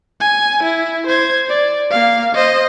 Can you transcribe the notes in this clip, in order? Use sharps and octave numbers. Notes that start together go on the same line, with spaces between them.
G#5
E4
C5 G#6
D5
A#3 F5
C5 D#5